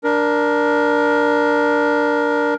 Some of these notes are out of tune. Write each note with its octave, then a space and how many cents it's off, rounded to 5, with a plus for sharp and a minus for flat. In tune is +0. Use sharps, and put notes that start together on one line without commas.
D4 +0 A#4 +15